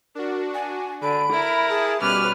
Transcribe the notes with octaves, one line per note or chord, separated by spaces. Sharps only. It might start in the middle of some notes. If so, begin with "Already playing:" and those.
D4 F#4 A#4
G#5
D3 B5 D7
E4 A#4
G#4 A5
B2 G3 C#4 B4 D6 F6